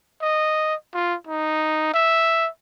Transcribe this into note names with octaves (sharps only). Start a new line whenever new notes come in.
D#5
F4
D#4
E5